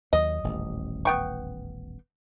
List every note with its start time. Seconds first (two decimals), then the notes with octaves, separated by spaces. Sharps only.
0.13 D#2 F#3 D#5
0.43 D#1 A1 E2
1.05 B3 G5 C#6